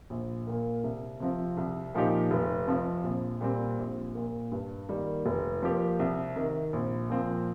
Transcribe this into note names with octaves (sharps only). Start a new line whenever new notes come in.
A#1
A#2 A#3
C2
C3 F3 C4
C2
A#2 F3 D#4 G4
F1
F2 C3 F3
A#1
A#2 G3 C4 G4
A#1
A#2 A#3
G2
D#3 G3 A#3
F1
F2 F3 A#3 G4
C2
C3 D#3
A#1
A#2 F3 C4